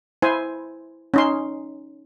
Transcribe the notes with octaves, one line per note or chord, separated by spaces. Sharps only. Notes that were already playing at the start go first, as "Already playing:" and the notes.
E4 C5 G#5
C#4 D#4 C6